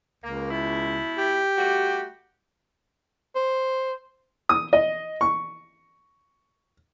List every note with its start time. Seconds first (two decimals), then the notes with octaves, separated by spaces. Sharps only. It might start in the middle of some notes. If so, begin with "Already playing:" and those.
0.24 C#2 A#3
0.50 B2 E4
1.18 G4
1.58 G3 A3 F#4
3.36 C5
4.49 D#6
4.73 D#5
5.21 C#6